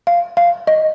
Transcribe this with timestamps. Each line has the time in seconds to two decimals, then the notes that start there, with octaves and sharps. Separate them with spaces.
0.07 F5
0.37 F5
0.67 D#5